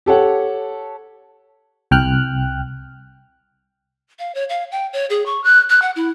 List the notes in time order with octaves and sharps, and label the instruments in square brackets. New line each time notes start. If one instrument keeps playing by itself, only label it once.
[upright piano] G4 A4 C#5 F#5
[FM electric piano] C2 G5 F6 F#6
[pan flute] F5
C#5
F5
G5
C#5
G#4
C#6
F#6
F#6
F#5
E4